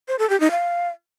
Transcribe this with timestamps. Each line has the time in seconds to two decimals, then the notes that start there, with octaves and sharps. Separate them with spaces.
0.08 C5
0.19 A4
0.30 G4
0.40 D#4
0.51 F5